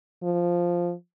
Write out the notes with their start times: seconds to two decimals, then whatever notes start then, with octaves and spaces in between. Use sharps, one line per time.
0.23 F3